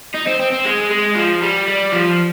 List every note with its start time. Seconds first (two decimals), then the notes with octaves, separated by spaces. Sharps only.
0.14 D#4
0.27 C4
0.39 C4
0.51 C4
0.65 G#3
0.90 G#3
1.15 F3
1.42 G3
1.68 G3
1.92 F3